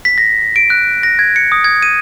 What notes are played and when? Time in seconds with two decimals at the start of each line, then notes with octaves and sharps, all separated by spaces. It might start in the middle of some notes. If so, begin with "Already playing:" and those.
0.05 B6
0.18 A#6
0.56 D7
0.70 F#6
1.03 A#6
1.19 G#6
1.36 C#7
1.52 D#6
1.64 G#6
1.83 D#7